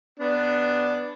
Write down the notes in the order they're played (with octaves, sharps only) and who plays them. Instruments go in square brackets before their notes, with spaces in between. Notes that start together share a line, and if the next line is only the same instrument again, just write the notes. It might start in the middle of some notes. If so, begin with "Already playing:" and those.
[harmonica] B3 D4